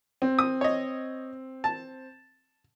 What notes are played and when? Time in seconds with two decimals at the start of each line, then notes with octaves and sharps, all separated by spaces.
0.22 C4
0.39 D#6
0.61 C#5 D#5
1.64 A5